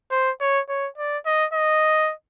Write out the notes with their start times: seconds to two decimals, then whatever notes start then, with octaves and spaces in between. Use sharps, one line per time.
0.12 C5
0.41 C#5
0.69 C#5
0.98 D5
1.26 D#5
1.54 D#5